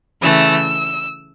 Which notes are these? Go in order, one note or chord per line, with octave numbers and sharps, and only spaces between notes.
C#3 E3 A3 E6